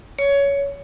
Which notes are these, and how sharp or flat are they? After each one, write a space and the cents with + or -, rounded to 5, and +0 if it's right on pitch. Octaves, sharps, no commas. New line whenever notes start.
C#5 +15